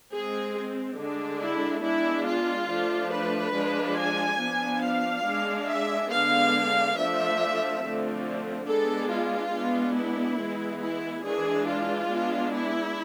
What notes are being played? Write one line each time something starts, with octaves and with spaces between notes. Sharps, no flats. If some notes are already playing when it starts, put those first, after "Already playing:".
G#3 C4 G#4
D3 G#3 D4
E4
G#3 B3 D4 E4
F4
F3 A3 D4
B4
F3 G#3 D4
G#5
F3 B3 D4
F5
G#3 D4
E5
D3 G#3 B3 D4 F5
F3 A3 D4 E5
D3 F3 A3 C4
G#3 B3 D4 A4
F4
G#3 B3 D4
E4
E3 G#3 B3
E4
E3 G#3 D4 G#4
F4
G#3 B3 D4
E4